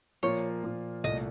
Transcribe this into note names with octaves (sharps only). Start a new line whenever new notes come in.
A#2 F3 A#3 F4 C#5
A#2 F3 A#3 F4
C2 A#2 A3 D#5